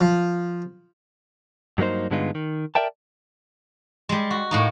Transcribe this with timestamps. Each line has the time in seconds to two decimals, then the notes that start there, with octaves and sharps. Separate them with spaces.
0.01 F3
1.78 G2 F#3 A#3 D#4 C5
2.11 G2 D3 G#3 B3 D#4 F4
2.35 D#3
2.75 A#4 D5 E5 G5 A5
4.09 G3 G#3
4.31 F#4
4.51 A2 A#3 D#4